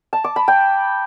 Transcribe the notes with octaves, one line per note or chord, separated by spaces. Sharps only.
A5
D6
B5
G5